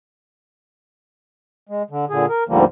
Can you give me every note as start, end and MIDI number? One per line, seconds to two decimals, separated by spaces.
1.69 1.83 56
1.90 2.05 50
2.10 2.26 46
2.10 2.26 50
2.10 2.26 68
2.29 2.44 70
2.49 2.65 38
2.49 2.65 44
2.49 2.65 50
2.49 2.65 53
2.49 2.65 55
2.49 2.65 58